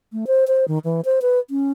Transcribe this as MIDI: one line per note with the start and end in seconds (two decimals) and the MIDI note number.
0.12 0.25 57
0.27 0.44 72
0.47 0.65 72
0.68 0.79 51
0.84 1.01 52
1.05 1.19 72
1.22 1.39 71
1.50 1.72 61